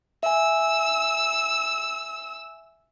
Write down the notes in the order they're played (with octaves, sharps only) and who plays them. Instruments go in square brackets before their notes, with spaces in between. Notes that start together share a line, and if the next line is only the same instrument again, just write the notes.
[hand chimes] E5 G#5 [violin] E6